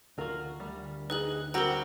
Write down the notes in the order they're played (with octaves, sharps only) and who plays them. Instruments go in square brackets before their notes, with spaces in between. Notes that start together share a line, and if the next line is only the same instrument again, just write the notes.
[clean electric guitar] D2 F#4 [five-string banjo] F4 A#4
[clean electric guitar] D2 [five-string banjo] G3
[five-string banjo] D#4 G#4 [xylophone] B4 F#6 F#7
[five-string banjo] G3 [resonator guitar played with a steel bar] C4 F#4 [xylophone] A#4 A#5